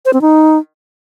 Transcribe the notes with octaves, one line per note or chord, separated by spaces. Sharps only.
C5
C4
D#4